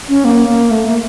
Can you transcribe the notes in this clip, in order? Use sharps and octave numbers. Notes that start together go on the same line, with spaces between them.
C#4
A#3
A#3
A3
A#3